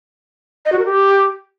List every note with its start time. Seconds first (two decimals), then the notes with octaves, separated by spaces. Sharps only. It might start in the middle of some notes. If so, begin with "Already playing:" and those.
0.66 D#5
0.72 F#4
0.79 A#4
0.85 G4